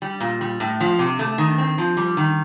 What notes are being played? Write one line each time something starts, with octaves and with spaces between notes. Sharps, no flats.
G3
A#2
G3
A2
F3
C3
A3
D#3
C4
F3
G3
D#3